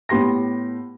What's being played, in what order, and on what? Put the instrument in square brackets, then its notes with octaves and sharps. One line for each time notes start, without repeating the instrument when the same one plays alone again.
[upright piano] A2 B3 G4 C6 A#6